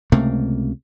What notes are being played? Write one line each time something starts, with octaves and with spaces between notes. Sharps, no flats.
C#2 C3 A3 A#3